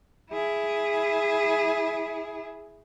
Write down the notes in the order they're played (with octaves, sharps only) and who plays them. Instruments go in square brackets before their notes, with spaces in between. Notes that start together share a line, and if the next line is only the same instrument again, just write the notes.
[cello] E4 G#4